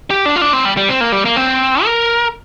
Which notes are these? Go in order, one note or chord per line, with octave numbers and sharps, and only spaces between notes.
G4
D4
F4
D4
C4
G3
G3
C4
A#3
G3
A#3
C4
A#4